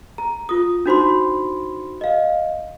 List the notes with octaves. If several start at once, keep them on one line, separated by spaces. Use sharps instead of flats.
A#5
F4 D#6
D4 D#4 F#4 C5 B5 C6
D#5 F5